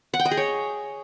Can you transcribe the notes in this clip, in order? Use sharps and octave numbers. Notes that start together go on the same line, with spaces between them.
F#5
G5
D#5
G#4
C#5